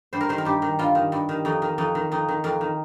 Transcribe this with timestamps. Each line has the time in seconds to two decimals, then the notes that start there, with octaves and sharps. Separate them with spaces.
0.13 G2 C5
0.21 A#4
0.29 D#3 C5
0.38 A#4
0.45 G2 G4
0.62 D#3
0.79 G2 F4
0.95 D#3
1.12 G2
1.29 D#3
1.45 F2 D#4
1.62 D#3
1.78 F2 D#4
1.95 D#3
2.12 F2 D#4
2.28 D#3
2.44 F2 A#4
2.61 D#3